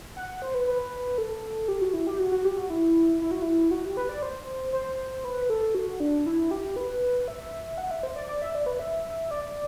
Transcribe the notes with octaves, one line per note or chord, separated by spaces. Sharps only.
F#5
F#5
C5
B4
B4
A4
G4
F#4
E4
G4
F#4
F#4
G4
F#4
E4
E4
F#4
E4
F#4
G4
B4
D5
C5
C5
B4
A4
F#4
D4
E4
G4
B4
E5
F#5
E5
C5
D5
D5
E5
D5
B4
E5
D5